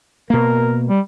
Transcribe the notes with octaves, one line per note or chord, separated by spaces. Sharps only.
B2 A#3 A#4
G3